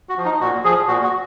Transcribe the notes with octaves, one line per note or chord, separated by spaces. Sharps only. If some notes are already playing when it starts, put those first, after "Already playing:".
F#4
F3
D#4
A#2 F#4
F3 G#4
A#2 F#4
F#4